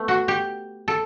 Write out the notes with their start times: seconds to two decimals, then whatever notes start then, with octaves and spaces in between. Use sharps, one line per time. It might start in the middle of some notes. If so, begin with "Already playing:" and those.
Already playing: A3 B3
0.08 F#4
0.28 G4
0.88 A4